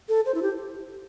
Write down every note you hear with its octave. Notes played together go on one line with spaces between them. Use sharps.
A4
C5
E4
G4